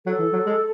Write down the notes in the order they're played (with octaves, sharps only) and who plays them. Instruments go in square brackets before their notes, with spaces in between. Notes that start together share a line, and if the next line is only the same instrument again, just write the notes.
[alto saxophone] F#3 [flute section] A4
[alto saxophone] E3
F#3
G#3